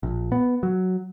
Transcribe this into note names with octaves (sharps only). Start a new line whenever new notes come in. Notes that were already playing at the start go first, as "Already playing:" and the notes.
A#1
B3
F#3